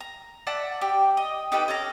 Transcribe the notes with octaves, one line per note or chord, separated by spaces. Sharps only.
A#5
D5 E5 F#5 A5
G4
D#5
D#4 G4 A4 B4
C#4 A4 A#5